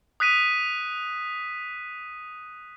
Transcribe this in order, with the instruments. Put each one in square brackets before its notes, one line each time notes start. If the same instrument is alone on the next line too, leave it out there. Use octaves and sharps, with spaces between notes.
[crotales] D#6 F#6 B6 D#7